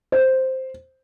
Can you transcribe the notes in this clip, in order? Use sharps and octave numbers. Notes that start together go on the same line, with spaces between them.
C5